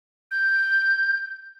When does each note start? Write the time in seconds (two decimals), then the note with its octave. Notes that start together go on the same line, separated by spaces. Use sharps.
0.31 G6